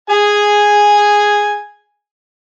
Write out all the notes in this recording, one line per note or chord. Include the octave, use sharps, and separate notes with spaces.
G#4 G#5